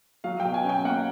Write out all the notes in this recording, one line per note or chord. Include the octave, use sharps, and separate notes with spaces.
F#3 F5
G5
B2
G#5
C#4 G5
A#3 F#5